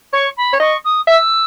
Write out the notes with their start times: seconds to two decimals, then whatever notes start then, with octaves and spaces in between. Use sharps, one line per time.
0.12 C#5 C#6
0.37 B5
0.53 C#5
0.60 D#5 C#6
0.84 D#6
1.07 E5 E6